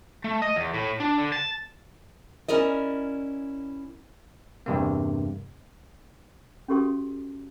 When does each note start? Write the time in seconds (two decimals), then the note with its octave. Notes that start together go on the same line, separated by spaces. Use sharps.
0.24 A3
0.42 D#5
0.56 E2
0.74 A2
1.00 D4
1.18 D3
1.32 A5
2.48 C#4 E4 A#4 D5 D#5
4.66 E2 G2 C3 A#3
6.68 C#4 F#4 G4 A4 C6 D#6